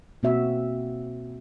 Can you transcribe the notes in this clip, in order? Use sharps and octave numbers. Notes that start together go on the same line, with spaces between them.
B2 A#3 C4 F#4 E5